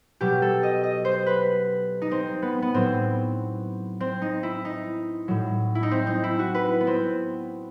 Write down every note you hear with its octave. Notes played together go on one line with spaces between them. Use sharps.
B2 F#3 G4
A4
D#5
D#5
C5
B4
D#4
C4
B3
B3
A2 F#3 C4
C4
D#4
E4
D#4
A2 F#3
E4
D#4
C4
D#4
E4
F#4
B4
B3
C4